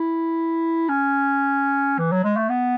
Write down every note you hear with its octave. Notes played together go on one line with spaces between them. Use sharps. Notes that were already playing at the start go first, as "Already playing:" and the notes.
Already playing: E4
C#4
E3
F#3
G#3
A3
B3